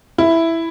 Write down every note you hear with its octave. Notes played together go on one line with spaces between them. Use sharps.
E4